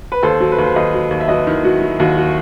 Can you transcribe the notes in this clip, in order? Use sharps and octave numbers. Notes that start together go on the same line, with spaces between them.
B4
D#2 A4 C5
F#3
B4
D#2
C5
D#2 B4 D#5
F#3
D#2
E5
F#3 B4 D#5
D#3 E4
F#3 F#4
F#3
D#2 F#4
F#4